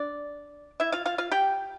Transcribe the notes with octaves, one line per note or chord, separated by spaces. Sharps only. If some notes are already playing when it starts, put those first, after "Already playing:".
Already playing: D4 D5
E4 E5
F4 F5
F4 F5
F4 F5
G4 G5